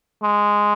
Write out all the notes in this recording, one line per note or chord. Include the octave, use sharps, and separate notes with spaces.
G#3